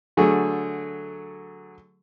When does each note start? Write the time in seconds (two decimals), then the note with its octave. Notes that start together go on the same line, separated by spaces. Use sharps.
0.17 D3 F#3 A3 G#4